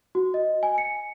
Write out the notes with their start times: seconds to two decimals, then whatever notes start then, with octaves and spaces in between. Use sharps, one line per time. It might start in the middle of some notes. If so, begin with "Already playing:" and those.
0.15 F#4
0.34 D#5
0.63 G#5
0.78 C#7